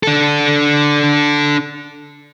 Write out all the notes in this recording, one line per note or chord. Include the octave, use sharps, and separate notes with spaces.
D4 A4